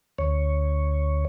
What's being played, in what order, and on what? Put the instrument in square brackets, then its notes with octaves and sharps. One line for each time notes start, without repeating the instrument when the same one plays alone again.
[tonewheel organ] D2 C#5